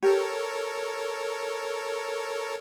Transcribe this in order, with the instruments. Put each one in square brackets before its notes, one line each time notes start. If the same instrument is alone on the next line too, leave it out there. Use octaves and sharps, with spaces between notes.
[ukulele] G4 [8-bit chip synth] A4 A#4 C#5